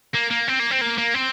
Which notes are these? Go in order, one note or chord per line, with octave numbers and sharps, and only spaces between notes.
A#3
A#3
C4
A#3
C4
A#3
A#3
C4